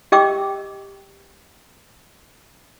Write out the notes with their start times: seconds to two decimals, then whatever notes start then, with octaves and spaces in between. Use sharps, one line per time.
0.12 G4 D#5 G5 D6 E6